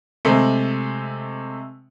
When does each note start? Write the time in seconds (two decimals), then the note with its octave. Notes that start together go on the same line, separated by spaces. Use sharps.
0.25 C3 G#3 A3